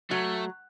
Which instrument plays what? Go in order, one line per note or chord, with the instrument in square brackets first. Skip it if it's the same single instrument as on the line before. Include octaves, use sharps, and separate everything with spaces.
[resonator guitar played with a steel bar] F#3 [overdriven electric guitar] A3